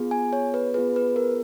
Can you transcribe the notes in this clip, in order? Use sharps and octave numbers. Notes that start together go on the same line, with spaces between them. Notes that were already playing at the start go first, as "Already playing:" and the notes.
Already playing: B3 F4 G#4
G#5
C#5
B4
B3 F4 G#4 B4
B4
A#4